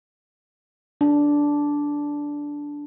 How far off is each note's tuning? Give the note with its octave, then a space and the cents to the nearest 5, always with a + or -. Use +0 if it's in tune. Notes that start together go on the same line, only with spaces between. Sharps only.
D4 -10